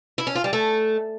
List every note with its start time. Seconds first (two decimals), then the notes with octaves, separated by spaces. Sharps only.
0.18 E4
0.27 C#4
0.35 F4
0.44 G3
0.53 A3